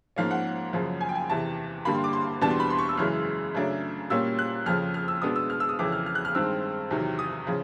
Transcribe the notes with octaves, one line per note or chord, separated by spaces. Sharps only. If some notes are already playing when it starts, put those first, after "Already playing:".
G#2 F3 A#3 C#4 F5
F#5
F#2 C#3 F3
G#5
G5
G#5
E2 C3 E3 A5
G2 D3 G3 A#3 B5
C6
D6
C6
E2 B2 G3 B3 D4 A5
C6
B5
C6
C#6
E6
F#2 C#3 E3 G#3 F6
F#2 C#3 F#3 A3 D4
A#2 G3 A#3 C#4 E6
F#6
F2 C#3 F3 F6
F6
E6
B2 G#3 B3 D4 D#6
E6
F6
E6
D#6
F2 C#3 E3 D6
F6
F6
F#6
F6
G2 D#3 G#3 C4 E6
E2 C3 D#3 F#3
D#6
C#3 F3